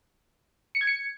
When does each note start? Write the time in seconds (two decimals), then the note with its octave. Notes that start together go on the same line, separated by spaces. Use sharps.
0.75 C#7
0.81 G#6
0.87 C#7